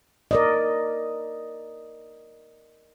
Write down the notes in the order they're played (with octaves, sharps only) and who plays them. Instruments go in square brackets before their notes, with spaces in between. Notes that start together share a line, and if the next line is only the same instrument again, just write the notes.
[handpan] A#4 D5 D#5